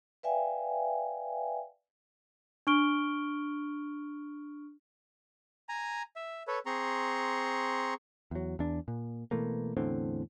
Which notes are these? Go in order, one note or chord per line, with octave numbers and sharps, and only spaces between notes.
B4 D5 E5 F5 G5 G#5
D4 C#6 F6 D7 G7
G#5 A#5
E5
A4 B4 C#5
C4 G#4 A#5 C6 C#6
E2 F#3
E2 D4
A#2
B2 E3 A3 A#3
E2 A2 D3 C4